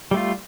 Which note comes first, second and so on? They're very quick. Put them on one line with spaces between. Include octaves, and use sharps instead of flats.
G3 A3 F4